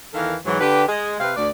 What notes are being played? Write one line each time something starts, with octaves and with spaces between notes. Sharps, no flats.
E2 D#3 E3 A4 A#4 F5
G#2 E3 F#3
D3 G4 B4
G#3
C3 C4 B4 F5
D2 D5